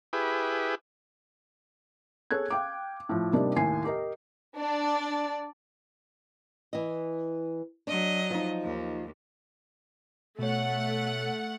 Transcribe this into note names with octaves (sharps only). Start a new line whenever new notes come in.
E4 G4 G#4 B4
G#4 A4 C#5 F#6 G#6
F5 G5 D6
A2 F3
C3 G3 A#3 D4 D#4 G4
D#2 A2 G#5 C7
G4 A#4 D#5
D4 D5
E3 D#5
F#3 D4 D#5
F3 D#4
D#2
B2 A3 C#5 F#5